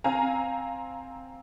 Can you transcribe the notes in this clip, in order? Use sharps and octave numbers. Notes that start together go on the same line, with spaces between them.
C4 F5 G#5 A#5